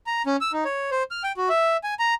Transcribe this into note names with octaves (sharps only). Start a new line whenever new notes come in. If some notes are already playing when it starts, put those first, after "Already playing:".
A#5
C#4
E6
D#4
C#5
C5
F6
G5
F#4
E5
G#5
A#5